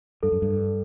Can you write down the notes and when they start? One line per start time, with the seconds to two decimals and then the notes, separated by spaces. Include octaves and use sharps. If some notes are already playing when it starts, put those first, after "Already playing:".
0.23 G2 A4
0.32 F#2
0.42 G2